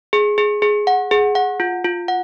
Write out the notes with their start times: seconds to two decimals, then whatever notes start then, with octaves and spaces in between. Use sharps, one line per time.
0.13 G#4
0.38 G#4
0.62 G#4
0.87 F#5
1.11 G#4
1.35 F#5
1.60 F4
1.85 F4
2.08 F#5